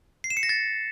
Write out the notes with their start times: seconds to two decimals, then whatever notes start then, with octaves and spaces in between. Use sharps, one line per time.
0.24 C7
0.30 E7
0.37 C#7
0.43 A#6
0.49 A6